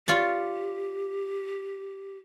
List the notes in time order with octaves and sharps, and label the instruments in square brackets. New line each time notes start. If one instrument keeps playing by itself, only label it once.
[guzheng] F4 C#5 D5 [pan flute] G4